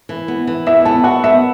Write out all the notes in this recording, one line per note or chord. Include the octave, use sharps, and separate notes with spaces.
E3
B3
E3
E2 E5
B3 A5
F#4 F#5
B3 E5